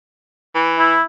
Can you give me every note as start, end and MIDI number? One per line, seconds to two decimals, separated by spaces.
0.55 0.95 52
0.78 1.02 64